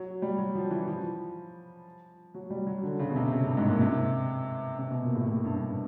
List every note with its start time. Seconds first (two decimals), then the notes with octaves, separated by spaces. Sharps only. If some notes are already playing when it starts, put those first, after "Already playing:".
Already playing: F#3
0.22 G3
0.38 F#3
0.55 F3
0.71 E3
0.88 F3
2.34 F#3
2.50 G3
2.67 F#3
2.83 D3
2.99 C#3
3.10 B2
3.16 C3
3.32 C#3
3.45 G2
3.57 G#2
3.69 A#2
3.81 C3
4.78 C3
4.91 B2
5.03 A#2
5.15 A2
5.27 A2
5.44 G2
5.60 G2